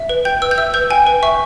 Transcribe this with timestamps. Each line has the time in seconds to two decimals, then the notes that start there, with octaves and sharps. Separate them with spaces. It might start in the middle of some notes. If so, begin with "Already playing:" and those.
Already playing: E5
0.09 B4
0.25 G5 G6
0.42 B4 E6
0.51 G6
0.58 E5 E6
0.74 B4 G6
0.90 G5 G#5
1.07 B4
1.23 E5 C#6